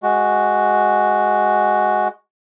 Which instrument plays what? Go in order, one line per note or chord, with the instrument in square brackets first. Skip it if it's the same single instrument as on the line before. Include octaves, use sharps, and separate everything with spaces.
[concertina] G#3 F#4